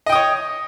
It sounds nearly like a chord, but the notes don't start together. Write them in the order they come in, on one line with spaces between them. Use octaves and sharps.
D#5 G5 D#6 C#5